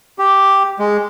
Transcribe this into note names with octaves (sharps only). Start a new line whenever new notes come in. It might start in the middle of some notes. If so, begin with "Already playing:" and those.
G4
G#3